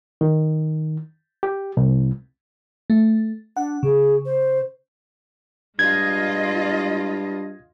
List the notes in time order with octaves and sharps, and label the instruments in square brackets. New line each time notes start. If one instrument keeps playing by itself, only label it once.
[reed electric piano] D#3
G4
C2
[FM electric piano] A3
[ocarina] D4 [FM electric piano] F#5
[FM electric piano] C#3 [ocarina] G#4
[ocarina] C5
[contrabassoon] G2 [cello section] G#3 F4 D#5 [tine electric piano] G#6